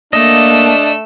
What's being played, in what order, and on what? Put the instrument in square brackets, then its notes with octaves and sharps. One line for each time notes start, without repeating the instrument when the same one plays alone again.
[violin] A3 E6 [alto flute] A#3 [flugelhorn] D4 [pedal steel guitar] D#5